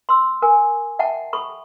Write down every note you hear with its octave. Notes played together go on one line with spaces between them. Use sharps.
C6 E6
A#4 G#5
E5 F#5 G5 A5
A4 B5 C#6